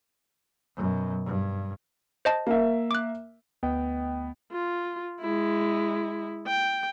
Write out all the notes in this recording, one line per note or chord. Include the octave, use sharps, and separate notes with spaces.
F#2 B2
G2
C5 D#5 A5
A#3 E5
D6 F#6
D2 B3 D#5 G5
F4
G#3 E4
G5